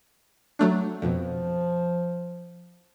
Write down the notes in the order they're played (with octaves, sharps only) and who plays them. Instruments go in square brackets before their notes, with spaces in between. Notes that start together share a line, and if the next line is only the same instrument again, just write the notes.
[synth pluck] F#3 A3 D4
[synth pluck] F2 B2 [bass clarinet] F3